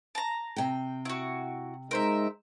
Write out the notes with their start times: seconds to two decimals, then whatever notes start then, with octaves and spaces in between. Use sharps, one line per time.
0.15 A5 A#5
0.56 C3 G5
1.05 E4 F#4
1.91 G#3 D#4 A#4 C5 E5